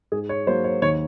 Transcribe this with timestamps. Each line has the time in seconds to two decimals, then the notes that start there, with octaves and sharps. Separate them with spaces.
0.12 G#2 G#4
0.29 C#5
0.47 F#3 A#3 C5
0.64 C#5
0.82 D#2 C#5